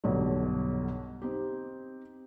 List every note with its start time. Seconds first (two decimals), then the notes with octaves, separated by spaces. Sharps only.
0.04 B1 G2 B2 D3 F#3
1.22 C4 D#4 G4